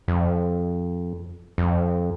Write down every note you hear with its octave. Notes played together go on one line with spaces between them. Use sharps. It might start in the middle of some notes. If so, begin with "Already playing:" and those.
F2
F2